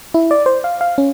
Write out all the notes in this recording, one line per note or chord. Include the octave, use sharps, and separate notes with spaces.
E4
D5
C5
F5
F5
C#4